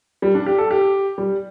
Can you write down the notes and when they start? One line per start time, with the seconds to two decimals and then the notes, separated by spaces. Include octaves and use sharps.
0.22 G3
0.35 D4
0.46 G4
0.58 A4
0.71 G4
1.18 G3